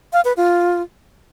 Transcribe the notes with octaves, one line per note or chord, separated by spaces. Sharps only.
F5
B4
F4